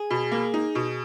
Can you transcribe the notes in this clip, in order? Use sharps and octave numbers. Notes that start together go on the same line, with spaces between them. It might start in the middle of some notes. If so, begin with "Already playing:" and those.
Already playing: G#4
B2
A#3
D#4
B2